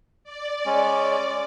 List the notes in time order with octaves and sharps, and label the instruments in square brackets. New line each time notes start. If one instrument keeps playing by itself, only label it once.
[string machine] D5
[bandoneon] G#3 C#4